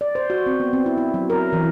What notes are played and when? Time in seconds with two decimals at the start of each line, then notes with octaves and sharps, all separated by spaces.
0.01 D5
0.15 C5
0.30 F#4
0.46 C4
0.60 B3
0.73 C4
0.86 E4
0.98 E4
1.14 F#3
1.30 A#4
1.53 E3